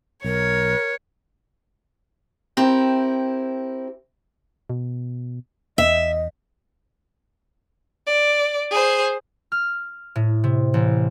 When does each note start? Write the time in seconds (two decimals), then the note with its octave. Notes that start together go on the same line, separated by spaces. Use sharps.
0.24 B1 A#4 C#5
2.57 C4 E4 G4 A#4
4.70 B2
5.78 E2 D#5 E5
8.07 D5
8.71 G#4 C5
9.52 F6
10.15 A2
10.44 C3
10.74 A1